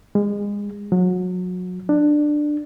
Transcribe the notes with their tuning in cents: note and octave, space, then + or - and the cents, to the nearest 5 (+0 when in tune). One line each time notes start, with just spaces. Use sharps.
G#3 -25
F#3 -30
D4 +15